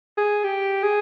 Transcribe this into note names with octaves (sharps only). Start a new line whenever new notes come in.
G#4
G4
G#4